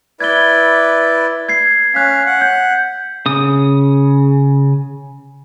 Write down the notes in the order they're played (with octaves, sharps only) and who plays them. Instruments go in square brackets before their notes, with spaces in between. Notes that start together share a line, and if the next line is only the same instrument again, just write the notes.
[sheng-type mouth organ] E4 B4 D5 [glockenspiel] G#6 G7
[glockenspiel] G#6 C7
[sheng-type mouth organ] C#4 F5 [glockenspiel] F#6 B6
[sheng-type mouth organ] F#5
[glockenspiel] G6
[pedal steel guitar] C#3 D#6